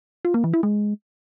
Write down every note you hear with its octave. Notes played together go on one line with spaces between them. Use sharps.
F4
A#3
E3
E4
G#3